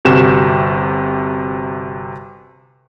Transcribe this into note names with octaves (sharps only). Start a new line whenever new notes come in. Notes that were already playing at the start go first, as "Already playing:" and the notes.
G1 C3 F#4 G4 E7